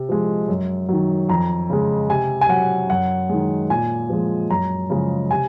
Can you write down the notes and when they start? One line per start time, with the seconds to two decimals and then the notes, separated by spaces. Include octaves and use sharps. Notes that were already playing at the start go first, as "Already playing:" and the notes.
Already playing: C3
0.09 F3 G#3
0.48 F#2
0.89 D#3 F#3
1.29 F2 A#5
1.70 C#3 G#3
2.09 C3 G#5
2.41 G#5
2.49 F#3 F#5
2.90 F#2 F#5
3.29 D#3 G#3
3.70 A#2 G#5
4.10 F3 G#3
4.50 F#2 A#5
4.90 C#3 F3 G#3
5.30 C3 G#5